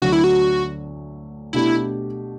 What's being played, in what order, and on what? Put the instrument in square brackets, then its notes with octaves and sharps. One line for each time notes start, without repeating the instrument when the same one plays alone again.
[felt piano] D2 D3 F#3 [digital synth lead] F#4
[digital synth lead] E4
F#4
[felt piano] B2 A3 D4 G4 [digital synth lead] E4